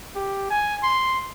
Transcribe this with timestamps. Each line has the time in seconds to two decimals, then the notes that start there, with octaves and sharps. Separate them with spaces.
0.15 G4
0.50 G#5
0.83 C6